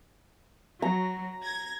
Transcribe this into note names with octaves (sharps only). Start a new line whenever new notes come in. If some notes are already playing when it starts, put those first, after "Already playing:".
F#3 A#5
G#6 A#6